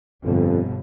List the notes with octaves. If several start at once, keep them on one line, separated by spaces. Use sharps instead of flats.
G1 F2 B2 D3